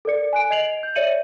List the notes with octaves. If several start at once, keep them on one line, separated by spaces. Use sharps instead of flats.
A4 A#4 D5 C#7
G#5 F#6 D7
D#5 G#6 C7 F7 F#7
G6
C#5 D5 E5 C#7 D#7 F#7